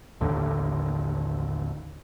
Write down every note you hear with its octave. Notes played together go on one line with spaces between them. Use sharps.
A1 D#2 D3